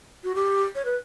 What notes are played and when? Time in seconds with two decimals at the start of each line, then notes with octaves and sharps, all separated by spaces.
0.24 F#4
0.35 G4
0.75 C#5
0.85 B4